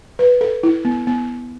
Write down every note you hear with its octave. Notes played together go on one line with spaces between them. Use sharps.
B4
A4
E4
B3
B3